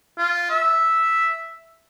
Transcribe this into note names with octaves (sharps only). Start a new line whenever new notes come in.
F4
E5